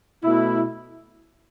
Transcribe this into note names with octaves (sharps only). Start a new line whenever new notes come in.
B2 A3 E4